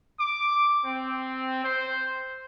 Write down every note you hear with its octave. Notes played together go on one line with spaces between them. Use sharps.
D6
C4
C5